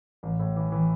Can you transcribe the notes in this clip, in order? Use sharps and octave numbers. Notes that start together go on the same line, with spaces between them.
A1
A2
E3
E3